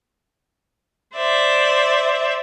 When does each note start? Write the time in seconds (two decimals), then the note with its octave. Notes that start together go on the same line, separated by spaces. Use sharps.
1.16 C5 D5 E5